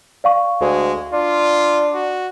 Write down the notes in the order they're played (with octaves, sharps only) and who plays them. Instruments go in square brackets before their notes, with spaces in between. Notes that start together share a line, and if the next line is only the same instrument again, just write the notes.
[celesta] D5 F5 C#6
[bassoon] D2 [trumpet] G#3
[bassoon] D4 [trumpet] F4
[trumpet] F#4